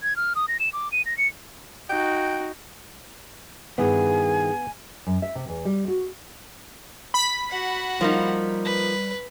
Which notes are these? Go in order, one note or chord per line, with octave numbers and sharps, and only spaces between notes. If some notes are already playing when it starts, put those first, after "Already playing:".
G#6
F6
D#6
A#6
E7
D6
D#7
A#6
C#7
D#4 F#4 G5
G2 D#3 B3 E4 G#4 G#5
F#2
E5
C3
E2
G3
F#4
B5 B6
F#4 F#5
F3 G3 A#3 D#4
B4